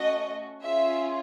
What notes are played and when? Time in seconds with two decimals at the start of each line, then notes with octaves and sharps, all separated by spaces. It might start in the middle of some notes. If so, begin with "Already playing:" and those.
Already playing: A3 C#4 F#4 D#5
0.63 C#4 F4 G#4 E5